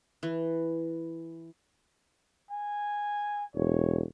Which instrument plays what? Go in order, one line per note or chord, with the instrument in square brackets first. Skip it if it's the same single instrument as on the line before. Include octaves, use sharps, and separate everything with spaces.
[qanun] E3
[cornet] G#5
[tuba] E1 [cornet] C#5